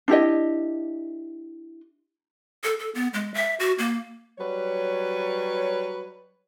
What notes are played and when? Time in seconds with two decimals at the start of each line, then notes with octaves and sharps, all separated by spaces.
0.08 D4 E4 G4 D#5
2.64 A4
2.79 A4
2.95 B3
3.14 G#3
3.34 E5
3.60 F#4
3.78 A#3
4.38 F#3 G3 B4 C#5